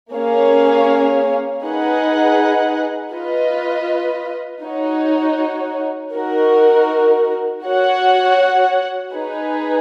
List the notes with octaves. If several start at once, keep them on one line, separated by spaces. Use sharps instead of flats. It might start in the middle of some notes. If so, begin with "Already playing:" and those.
A#3 C#4 G#4 C#5 F5
D#4 G#4 B4 D#5 F#5
F4 B4 D#5
D#4 F#4 C#5
D#4 F#4 A#4
F#4 C#5 F#5
D#4 G#4 B4